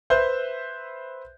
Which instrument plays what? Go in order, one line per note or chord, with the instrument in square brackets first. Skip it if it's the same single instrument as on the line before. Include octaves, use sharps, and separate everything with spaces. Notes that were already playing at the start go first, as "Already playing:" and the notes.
[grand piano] B4 C5 E5 G6